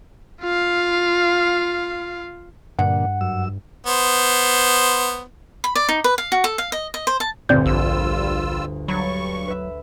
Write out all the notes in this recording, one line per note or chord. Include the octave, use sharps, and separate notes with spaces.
F4 F5
G2 A#2 D3 F#5
F#2 E6
B3 C5
B5
D5
D#4
B4
F5
F#4
A4
F5
D#5
D#5
C5
A5
G1 D2 A#2 C4 D5 G6
A#1 G3 F4 E6
G2 F#3 B5 C#6 G#6 A6
B4 E5